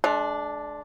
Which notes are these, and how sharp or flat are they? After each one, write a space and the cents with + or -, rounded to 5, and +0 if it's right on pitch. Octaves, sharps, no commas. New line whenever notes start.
G#3 +45 D4 +0